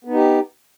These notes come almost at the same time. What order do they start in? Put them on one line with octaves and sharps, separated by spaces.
B3 D#4 G4